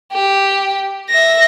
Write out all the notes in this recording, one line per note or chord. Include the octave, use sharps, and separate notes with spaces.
G4
E5 A#6